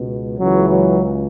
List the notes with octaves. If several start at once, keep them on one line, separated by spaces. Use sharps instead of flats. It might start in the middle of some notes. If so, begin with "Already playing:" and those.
Already playing: C#2 B2
C#2 C#3 E3 F#3
F#3